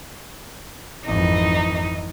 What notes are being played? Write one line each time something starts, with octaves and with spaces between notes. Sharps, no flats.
G#1 F2 E3 D#4